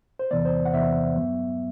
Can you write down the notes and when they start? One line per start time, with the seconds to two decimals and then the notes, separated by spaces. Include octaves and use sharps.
0.19 C5
0.31 E2 C3 E3 B3 D5
0.45 C5
0.65 F#5
0.73 E2 C3 E3 B3 E5
1.15 G2 F#3 B3